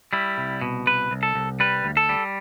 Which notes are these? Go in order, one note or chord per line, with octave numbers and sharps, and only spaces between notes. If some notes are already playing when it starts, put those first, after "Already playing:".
G3 E4
C2
B2
C2 B4
C2
A4
C2
G3 B4
D2
A4
G3